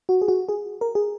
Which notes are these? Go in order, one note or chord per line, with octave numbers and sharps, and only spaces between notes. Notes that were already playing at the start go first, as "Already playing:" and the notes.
F#4
G#4
F#4
G#4
A#4
G#4